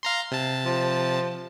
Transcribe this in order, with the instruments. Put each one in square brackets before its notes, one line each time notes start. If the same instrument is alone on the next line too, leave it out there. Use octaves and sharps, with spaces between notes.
[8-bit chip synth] F5 A#5 C6
C3 A5
[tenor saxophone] F3